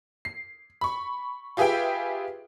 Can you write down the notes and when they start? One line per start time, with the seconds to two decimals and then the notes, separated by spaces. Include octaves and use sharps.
0.25 C7
0.81 B5 C#6
1.57 F4 G4 G#4 B4 E5 G5